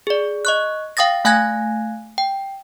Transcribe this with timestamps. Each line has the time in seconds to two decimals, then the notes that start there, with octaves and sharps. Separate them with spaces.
0.07 G#4 D5
0.45 D#5 C#6 F#6
0.97 F5 G5 D#6 A6 A#6
1.25 A3 F5 G#5 F#6 G#6 A#6
2.18 G5